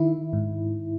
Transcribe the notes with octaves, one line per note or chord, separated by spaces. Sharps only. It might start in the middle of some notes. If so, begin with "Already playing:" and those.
Already playing: D#3 E4
G#2